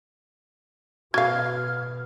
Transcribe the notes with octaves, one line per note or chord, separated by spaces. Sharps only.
B2 F#4 F5 F6 G#6